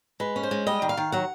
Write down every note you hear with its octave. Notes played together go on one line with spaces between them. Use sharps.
G#3 B4
C#4
C5
G#3
G3 D#5
D#3
F5
D#3
F#3 F#5